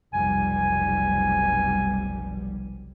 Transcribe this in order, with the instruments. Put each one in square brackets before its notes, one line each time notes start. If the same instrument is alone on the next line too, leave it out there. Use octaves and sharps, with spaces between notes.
[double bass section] F1 B1 G3 [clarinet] G#5